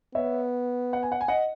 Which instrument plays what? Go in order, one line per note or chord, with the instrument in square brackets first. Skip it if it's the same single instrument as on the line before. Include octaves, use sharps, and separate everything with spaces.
[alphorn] B3 [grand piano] C#5 E5
[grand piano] F#5
G#5
F#5
G#5
D#5 F#5